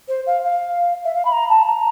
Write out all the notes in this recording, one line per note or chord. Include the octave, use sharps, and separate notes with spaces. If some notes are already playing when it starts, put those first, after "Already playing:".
C5
F5
F5
E5
F5
B5
A#5
A5
A#5